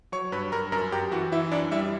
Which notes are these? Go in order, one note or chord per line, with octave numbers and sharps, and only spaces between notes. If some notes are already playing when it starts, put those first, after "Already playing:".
F#3 C#5 C#6
G2 B4 B5
G2 A#4 A#5
F#2 A#4 A#5
F#2 G4 G5
E3 F#4 F#5
E3 E4 E5
F#2 D4 D5
G3 E4 E5